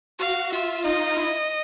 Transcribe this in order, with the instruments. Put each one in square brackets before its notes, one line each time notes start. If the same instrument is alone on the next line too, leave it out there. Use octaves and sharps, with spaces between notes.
[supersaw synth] F#4 [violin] F5
[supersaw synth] F4 [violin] E5
[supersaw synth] D#4 [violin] D#5
[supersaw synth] E4